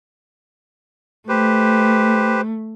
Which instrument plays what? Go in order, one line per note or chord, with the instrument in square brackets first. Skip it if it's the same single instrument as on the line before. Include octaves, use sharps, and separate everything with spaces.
[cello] A3 [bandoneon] G4 B4 C5